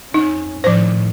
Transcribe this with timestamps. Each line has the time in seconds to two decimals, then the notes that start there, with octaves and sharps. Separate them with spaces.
0.14 F2 C#4 D#4
0.64 A2 D#3 F3 C5